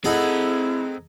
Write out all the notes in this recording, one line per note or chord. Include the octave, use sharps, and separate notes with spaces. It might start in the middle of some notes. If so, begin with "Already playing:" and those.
C4 D#4 E4 G#4 A4 F#5